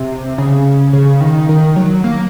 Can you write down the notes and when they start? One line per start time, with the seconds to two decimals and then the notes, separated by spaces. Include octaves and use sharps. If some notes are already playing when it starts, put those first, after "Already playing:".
Already playing: C3
0.38 C#3
0.93 C#3
1.21 D#3
1.49 D#3
1.76 F#3
2.04 A#3